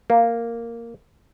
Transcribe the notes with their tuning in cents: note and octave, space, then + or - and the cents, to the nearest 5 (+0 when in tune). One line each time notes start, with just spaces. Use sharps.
A#3 -5